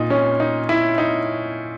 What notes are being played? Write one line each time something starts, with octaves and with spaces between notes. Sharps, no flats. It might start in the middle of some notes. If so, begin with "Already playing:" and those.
Already playing: A#2 D#4
C#4
D#4
E4
D#4